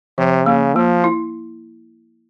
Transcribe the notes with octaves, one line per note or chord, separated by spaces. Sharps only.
C3 F3
C#3 A#3
F3 A#3
E4